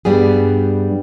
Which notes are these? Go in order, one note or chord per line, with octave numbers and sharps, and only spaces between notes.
G2 G3 B3 G#4